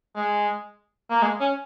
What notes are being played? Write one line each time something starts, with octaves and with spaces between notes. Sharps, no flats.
G#3
A#3
G#3
C#4